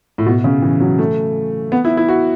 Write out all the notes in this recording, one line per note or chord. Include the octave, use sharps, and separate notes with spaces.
A2
B2
C#3
E3
F#3
A3
B3
E4
E4
F#4